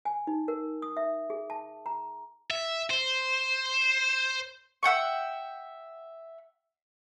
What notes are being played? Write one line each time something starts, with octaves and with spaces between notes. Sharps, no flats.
G#5
D#4
A#4
D#6
E5
G#4
A5
A#5
E5
C5
E5 F#5 G5 C#6